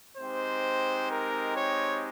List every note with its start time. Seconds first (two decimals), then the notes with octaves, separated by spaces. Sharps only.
0.18 G#3 C4 D#4 G4 C5
1.11 A#4
1.56 C#5